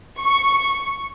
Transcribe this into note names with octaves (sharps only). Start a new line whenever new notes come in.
C#6